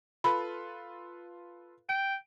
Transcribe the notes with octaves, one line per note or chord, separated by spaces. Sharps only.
F4 A4 B4 B5
G5 D7